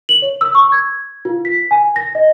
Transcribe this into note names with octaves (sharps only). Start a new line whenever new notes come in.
F#7
C#5
E6
C#6
G#6
F4
B6
G#5
A#6
D#5